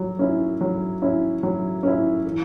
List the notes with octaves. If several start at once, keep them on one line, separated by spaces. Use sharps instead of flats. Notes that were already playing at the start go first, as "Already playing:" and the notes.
Already playing: F#3
C#4 E4
F#3
C#4 E4
F#3
C#4 E4
E3